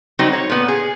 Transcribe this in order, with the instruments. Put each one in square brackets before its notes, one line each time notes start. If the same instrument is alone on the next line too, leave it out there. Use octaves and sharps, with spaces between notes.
[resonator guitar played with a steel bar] F#3 G3 C4 D#4 F#4
C#5
A#2 B3
G#4